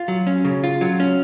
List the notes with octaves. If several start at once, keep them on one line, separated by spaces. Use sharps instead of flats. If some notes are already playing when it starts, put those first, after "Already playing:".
Already playing: F4
F#3
C#4
C#3
F4
F#3
C#4